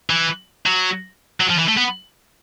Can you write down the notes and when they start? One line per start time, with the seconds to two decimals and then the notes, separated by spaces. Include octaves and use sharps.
0.10 E3
0.66 F#3
1.40 F#3
1.49 F3
1.58 E3
1.68 A3
1.77 B3